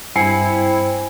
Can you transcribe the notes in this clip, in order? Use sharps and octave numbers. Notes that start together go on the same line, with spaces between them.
G2 C4 E4 G#5 C7 C#7